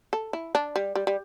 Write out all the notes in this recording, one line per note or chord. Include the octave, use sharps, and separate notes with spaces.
A4
E4
D4
G3
G3
G3